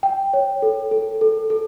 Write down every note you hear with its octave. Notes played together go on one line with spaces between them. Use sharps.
G5
C#5
A4
A4
A4
A4